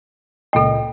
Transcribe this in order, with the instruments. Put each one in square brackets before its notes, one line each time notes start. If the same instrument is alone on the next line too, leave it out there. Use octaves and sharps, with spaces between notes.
[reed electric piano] C#2 A#2 D#5 [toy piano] A4 G5